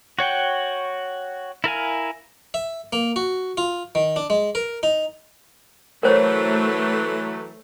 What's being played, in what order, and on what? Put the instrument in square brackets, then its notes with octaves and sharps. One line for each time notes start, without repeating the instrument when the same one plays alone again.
[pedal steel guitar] F#4 C#5 F#5 G5
E4 A#4 F5 G#5
[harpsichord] E5
A#3
F#4
F4
D#3
D4
G#3
A#4
D#4
[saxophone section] E3 F#3 [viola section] A3 [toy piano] A#4 C5 C#5